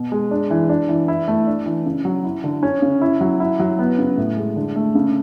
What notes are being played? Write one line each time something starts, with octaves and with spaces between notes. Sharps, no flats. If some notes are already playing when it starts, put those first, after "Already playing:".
Already playing: B2
G#3
D4
E3
D4
E3
E4
A3
D4
E3
C#3
F#3
E4
D3
C#4
C#3
E4
F#3
E4
F#3
B3
C#3
A2
G#3
D3
A3
C#3